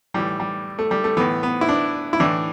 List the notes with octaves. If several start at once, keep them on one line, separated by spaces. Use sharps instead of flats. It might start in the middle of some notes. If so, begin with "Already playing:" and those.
A2 E3 G3
G3
A3
G3
A3
A2 E3 B3
B3
E4
D4
E4
A2 E3 D4